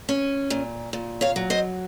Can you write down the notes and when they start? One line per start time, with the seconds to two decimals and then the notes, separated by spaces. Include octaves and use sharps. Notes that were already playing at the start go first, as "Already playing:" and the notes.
0.09 C#4
0.50 A#2
0.93 A#2
1.21 C#5 F5
1.36 F#3
1.50 C5 D#5